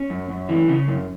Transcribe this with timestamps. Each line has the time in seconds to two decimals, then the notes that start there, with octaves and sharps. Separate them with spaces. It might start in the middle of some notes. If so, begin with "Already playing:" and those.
Already playing: C#4
0.10 F#2
0.30 F#2
0.49 E3
0.68 C#3
0.88 F#2